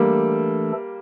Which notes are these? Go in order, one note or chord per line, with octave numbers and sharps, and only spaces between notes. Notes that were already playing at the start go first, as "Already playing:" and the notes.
Already playing: E3 G3 A3 A#3 D4 A4